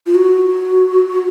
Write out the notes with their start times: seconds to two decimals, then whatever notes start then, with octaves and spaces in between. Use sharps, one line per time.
0.06 F4
0.15 F#4